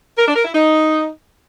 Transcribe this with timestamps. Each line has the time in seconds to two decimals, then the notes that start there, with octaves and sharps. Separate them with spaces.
0.18 A#4
0.27 D4
0.36 A#4
0.45 E4
0.53 D#4